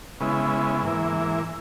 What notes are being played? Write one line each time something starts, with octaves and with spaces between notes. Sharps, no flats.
C#3 G#3 B3 E4
G#2 E3 A#3 E4